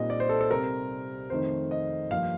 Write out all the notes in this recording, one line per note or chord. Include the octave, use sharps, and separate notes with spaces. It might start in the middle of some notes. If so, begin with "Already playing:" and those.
Already playing: A#2 G3 C4 D#4 D#5
D5
C5
A4
A4
C3 G3 C4 A#4
F2 D#3 A3 D#4 C5
D#5
G2 F3 A#3 F5